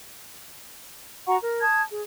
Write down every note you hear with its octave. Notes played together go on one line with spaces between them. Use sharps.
F#4 F#5 A#5 C#6
A#4
A5 D#6 G#6
G#4